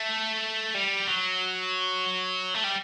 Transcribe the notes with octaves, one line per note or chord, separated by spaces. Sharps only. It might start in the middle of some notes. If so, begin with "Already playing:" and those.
Already playing: A3
G3
F#3
A3
G3